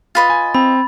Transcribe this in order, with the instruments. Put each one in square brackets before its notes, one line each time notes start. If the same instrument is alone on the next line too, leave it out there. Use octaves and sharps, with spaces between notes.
[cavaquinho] F4 B4 D#5 [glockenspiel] A6
[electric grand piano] G#5
[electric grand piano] C4 [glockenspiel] B5